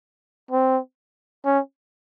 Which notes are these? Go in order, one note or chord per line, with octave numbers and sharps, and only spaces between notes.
C4
C#4